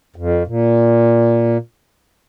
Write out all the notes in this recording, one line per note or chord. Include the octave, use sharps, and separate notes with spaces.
F2
A#2